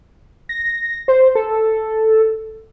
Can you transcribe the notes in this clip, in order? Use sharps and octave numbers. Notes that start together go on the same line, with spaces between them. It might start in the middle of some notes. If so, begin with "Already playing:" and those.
A#6
C5
A4